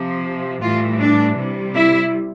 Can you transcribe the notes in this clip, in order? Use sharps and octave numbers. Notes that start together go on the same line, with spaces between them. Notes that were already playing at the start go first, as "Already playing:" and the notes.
Already playing: C3 F3
A2 E3 G3 F4
D4
C3 G3
E4